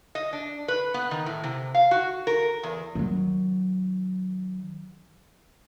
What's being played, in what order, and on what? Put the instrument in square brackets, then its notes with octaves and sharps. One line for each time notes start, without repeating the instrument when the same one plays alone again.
[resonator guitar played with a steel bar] D#5
D4
B4
B3
D#3
A2
C3
F5
F#4
A#4
E2
[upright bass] D#3 F#3